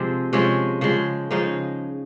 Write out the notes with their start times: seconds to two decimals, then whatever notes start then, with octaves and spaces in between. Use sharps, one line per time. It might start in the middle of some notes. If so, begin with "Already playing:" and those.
Already playing: C3 F3 G#3 C4
0.33 C3 F3 G#3 C#4
0.81 C#3 F3 G#3
1.31 C#3 F3 G#3 D#4